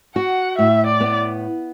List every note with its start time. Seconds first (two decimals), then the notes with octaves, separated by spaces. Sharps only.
0.16 F#4 F#5
0.58 A2 E5
0.86 D5
1.00 B3